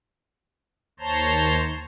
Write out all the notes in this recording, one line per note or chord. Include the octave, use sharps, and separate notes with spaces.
D#2 C5 C#5 A5 A#5 C6